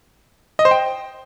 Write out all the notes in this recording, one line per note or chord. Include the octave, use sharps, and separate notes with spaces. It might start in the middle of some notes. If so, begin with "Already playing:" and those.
D#5
C5
G5